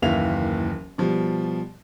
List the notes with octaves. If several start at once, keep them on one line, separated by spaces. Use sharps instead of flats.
F#1 D#2 E3 E5 F5 F7
B2 F3 G3